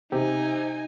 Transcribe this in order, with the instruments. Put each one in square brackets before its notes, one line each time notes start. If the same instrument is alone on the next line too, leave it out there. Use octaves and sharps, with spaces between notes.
[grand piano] C3 [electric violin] D#4 G#5 [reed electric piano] G4